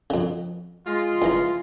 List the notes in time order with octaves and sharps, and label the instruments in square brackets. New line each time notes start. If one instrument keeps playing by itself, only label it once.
[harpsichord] F2 C#3
[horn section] G#3 F4
[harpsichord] C#2 E3 A#5